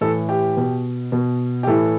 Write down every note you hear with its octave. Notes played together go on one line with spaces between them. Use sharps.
A2 E3 A4
G4
B2
B2
G4
A2 E3 A4